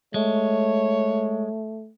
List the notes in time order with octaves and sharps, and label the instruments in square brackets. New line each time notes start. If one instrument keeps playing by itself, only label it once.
[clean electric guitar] G#3 [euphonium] A3 [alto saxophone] C#5